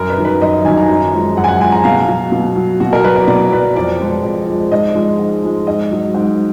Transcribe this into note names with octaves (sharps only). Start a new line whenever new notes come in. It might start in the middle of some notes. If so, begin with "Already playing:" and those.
Already playing: F#2 A#4
B4
D#3 F#3
B4
F#2 D#5
D#5
D#3 F#3 G#5
A#5
F#2
F3 G#3
F#2 F#5
G#5
F#5
F3 G#3 G#5
A#5
B2 F5
F#3
B2
F#3
B2 F#4
A#4
F#3 B4
D5
B2 D5
F#3 B4
F2 D5
F3 G#3
F2
F3 G#3
G#2 D#5
F3 G#3
G#2
F3 G#3
G#2 D#5
F#3
G#2